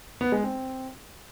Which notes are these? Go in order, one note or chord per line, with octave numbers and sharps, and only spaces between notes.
B3
G#3
C4